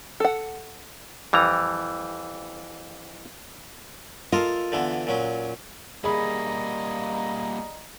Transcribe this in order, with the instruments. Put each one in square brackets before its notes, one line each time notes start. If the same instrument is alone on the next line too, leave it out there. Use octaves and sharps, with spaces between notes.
[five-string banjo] A4 F#5
[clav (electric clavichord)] F2 E3 G3 A#5
[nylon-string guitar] F4 [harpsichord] A4 A#4 D#5
[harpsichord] D3 E3 B3
A#2 F#3 C#4
[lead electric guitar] G3 A#3 [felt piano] G#4 B5 [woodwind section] D5 D#5 A#5